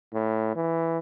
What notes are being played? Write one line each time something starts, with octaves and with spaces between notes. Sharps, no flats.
A2
E3